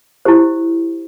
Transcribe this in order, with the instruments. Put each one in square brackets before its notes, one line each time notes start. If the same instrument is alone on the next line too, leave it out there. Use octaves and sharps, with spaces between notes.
[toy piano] E4 G4 C5